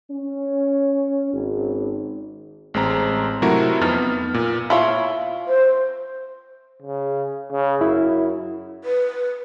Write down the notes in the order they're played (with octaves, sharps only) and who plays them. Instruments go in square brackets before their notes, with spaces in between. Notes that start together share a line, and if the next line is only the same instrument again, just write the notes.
[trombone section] C#4
G#1
[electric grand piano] A1 G#3 C4 A#5
C3 F#3 A3 E4 F#4 A#4
F2 B3 D#4 F6 A6
B3
A#2
[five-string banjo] E4 F4 C#5
[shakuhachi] C5
[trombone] C#3
C#3
[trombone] F#2 [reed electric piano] E4
[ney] B4